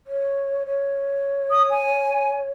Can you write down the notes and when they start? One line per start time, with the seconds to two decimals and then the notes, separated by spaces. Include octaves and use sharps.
0.07 C#5
0.66 C#5
1.51 D#6
1.70 G#5